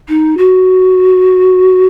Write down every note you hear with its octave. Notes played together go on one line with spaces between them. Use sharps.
D#4
F#4